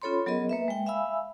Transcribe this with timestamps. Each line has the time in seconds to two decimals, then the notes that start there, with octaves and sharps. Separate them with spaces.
0.02 C#4 F4 A4 C#5 B5 C6
0.26 F#3 B3 G#4 A#4 D#5
0.49 A#3 B4 E5
0.68 G#3 G5
0.86 E5 F5 G#5 B5 E6